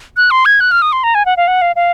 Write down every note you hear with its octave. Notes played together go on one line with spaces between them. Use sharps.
F#6
C6
G#6
F#6
F6
D#6
C6
A#5
G#5
F#5
F5
F#5
F5
F5